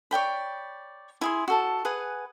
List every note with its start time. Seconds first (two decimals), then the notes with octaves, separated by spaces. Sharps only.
0.11 C#5 D5 G5 B5
1.21 E4 G#4 C6
1.48 F#4 A4 A5
1.85 G#4 B4 F#5 G#5